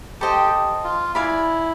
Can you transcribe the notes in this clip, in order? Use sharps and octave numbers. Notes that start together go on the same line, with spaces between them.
G4 A4 C5 D#5 G5
F4
E4 D5 F5 G#5 B5